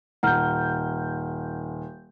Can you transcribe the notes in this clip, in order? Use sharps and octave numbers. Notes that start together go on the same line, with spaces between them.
D#1 F#5 A#5 F6 G6